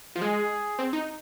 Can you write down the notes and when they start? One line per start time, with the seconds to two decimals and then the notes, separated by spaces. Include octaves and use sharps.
0.16 F3
0.22 G#3 G#4
0.79 C4
0.93 D#4